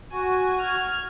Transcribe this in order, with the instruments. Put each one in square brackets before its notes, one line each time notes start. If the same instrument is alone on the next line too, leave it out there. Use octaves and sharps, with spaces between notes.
[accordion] F#4 [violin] G#5
[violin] F6 G#6